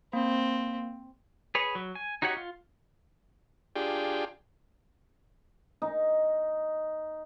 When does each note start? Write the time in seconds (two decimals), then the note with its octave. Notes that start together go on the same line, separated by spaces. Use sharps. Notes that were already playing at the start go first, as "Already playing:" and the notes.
0.13 A#3 C4
1.55 G#4 B4 C#5
1.75 F#3
1.95 G#5
2.22 D#4 F#4 G4 C#5 F#5
2.37 F4
3.76 D4 F4 G4 G#4 G5
5.82 D#4